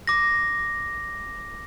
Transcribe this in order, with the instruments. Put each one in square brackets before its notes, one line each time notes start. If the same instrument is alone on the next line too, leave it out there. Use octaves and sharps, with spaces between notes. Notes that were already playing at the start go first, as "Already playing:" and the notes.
[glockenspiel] D6 A#6